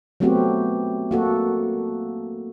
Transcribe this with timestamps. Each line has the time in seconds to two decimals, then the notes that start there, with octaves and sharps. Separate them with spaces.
0.20 F#3 A3 B3 C4 F#4 G4
1.11 A#3 F#4 A4